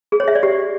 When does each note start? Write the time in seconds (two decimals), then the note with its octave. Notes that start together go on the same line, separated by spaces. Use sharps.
0.12 G#4
0.20 C#5
0.28 E5
0.35 D5
0.43 G4